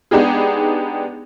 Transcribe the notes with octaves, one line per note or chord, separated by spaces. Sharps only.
G#3 B3 D4 D#4 G4 G#4